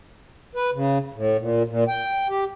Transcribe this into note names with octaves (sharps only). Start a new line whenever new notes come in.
B4
C#3
A2
A#2
A#2
G5
G4